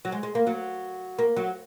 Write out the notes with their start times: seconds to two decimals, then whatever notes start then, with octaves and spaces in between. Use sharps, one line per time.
0.05 F#3
0.12 G#3
0.23 G#3
0.35 A#3
0.47 F#3
1.19 A#3
1.36 F#3